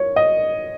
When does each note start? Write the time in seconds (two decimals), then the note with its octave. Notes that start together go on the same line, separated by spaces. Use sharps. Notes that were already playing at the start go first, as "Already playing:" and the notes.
Already playing: C#5
0.16 D#5